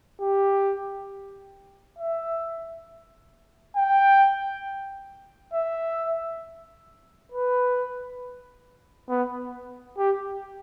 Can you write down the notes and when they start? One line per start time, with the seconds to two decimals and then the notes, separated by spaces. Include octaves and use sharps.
0.21 G4
1.99 E5
3.76 G5
5.54 E5
7.32 B4
9.09 B3
9.98 G4